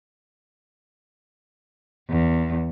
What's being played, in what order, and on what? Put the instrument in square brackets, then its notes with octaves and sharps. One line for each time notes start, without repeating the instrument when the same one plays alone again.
[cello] E2